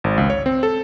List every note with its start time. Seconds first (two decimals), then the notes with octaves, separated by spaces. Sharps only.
0.04 G#1
0.18 C#2
0.30 C#5
0.46 C4
0.63 A4